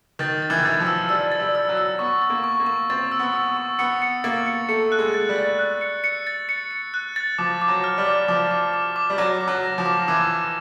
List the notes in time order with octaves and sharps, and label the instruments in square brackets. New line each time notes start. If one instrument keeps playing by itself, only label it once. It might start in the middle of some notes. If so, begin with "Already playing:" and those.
[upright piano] D#3 [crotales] A6
[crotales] A6
[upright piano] E3
D#3
[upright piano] E3 [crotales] A6
[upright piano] F3
[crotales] E6
[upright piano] G3 [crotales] E6
[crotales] A6
[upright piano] G3
[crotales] E6
[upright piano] F#3
[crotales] E6
[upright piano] B3 [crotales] C#6
[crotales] A6
[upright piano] A#3
[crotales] C#6
[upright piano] A#3
[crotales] C#6
[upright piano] C4 [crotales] A6
[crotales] E6
[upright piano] B3
[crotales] E6
C#6
[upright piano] B3 [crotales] C#7
[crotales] C#7
[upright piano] A#3 [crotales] A6
[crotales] C#7
[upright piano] A3 [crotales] C#7
[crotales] F#6
[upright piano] G#3
[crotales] A6
[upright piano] G3
[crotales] A6
F#6
C#7
C#7
A6
C#7
C#7
F#6
A6
[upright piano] F3 [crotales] D6
[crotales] D6
[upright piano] F#3
[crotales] F6
[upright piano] G3
[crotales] D6
[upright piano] F3 [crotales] D6
[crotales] D6
D6
D6
[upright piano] G3
[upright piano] F#3 [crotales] D6
[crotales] D6
[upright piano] F#3
[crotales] A#6
[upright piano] F3
[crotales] D6
[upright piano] E3 [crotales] D6
[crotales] D6